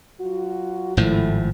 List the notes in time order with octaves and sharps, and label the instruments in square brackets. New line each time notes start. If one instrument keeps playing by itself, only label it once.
[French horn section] F#3 F4 F#4
[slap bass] G#1 A2 F3 [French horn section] A3 E4